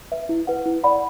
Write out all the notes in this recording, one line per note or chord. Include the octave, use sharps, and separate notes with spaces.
B4 E5
E4
B4 F#5
E4
D5 F#5 B5